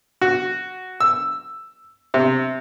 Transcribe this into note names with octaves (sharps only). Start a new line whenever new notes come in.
F#4
E6
C3